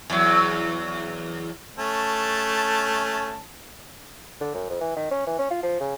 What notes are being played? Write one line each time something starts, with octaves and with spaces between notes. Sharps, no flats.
E2 F#3
A3 C#4 A5
D3
F#2
F2
E3
D#3
C#4
E3
C#4
F4
F3
C#3